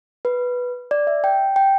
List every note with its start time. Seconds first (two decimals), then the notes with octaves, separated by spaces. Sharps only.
0.25 B4
0.91 D5
1.07 E5
1.24 G5
1.56 G5